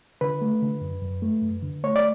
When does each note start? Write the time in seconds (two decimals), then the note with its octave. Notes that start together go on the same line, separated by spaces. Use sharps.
0.21 D3 B4
0.42 A3
0.62 D3
0.81 F#2
1.02 F#2
1.22 A3
1.42 F#2
1.62 D3
1.83 A3 C#5
1.96 D5